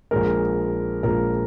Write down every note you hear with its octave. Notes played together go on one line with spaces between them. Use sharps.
A#1 A#2 G#3 A#4
A#1 A#2 G#3 A#4